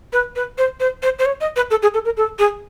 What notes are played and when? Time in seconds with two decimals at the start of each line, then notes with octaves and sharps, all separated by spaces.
0.13 B4
0.36 B4
0.58 C5
0.80 C5
1.03 C5
1.19 C5
1.26 C#5
1.41 D#5
1.56 B4
1.71 A4
1.82 G#4
1.94 A4
2.05 A#4
2.17 A4
2.39 G#4